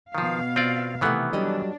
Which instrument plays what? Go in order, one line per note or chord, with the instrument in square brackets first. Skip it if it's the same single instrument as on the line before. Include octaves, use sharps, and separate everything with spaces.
[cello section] B2 F5 [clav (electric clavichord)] D#3 F3
[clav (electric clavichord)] C4 F4 D5
[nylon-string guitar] C3 A3 F#5 [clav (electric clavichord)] D#3 E3 B3
[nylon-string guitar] F#3 G3 D#5 [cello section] D4